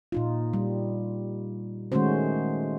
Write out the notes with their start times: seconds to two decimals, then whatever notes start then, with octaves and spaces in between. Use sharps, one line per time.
0.12 A#2 D#4 F4
0.53 G3
1.92 D#3 G#3 A3 C#4 F#4 C5